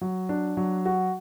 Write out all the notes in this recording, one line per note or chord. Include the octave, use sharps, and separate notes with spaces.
F#3
D4
F#3
F#4